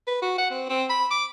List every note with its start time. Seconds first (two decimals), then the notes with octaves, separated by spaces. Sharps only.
0.07 B4
0.22 F#4
0.38 F#5
0.51 C4
0.69 C4
0.90 B5
1.11 D6